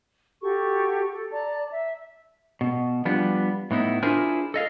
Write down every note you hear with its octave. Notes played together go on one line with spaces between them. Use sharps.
F#4 G4 A4 C#6
A4
D5 A5 A#5
E5
B2
F3 G3 B3 D4
A2 B3 D#4 E4
D4 E4 F4 G#4 A#4 C5
A4 D#5 F5